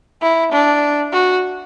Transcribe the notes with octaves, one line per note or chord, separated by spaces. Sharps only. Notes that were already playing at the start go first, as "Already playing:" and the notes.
E4
D4
F#4